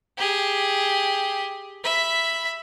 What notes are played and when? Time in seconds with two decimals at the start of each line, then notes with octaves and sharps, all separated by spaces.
0.18 G4 G#4
1.84 E5 B5